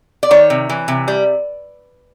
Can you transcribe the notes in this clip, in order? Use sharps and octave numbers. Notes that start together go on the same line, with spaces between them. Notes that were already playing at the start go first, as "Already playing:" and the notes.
D5
D#3 C#5
C3
E3
C3
G3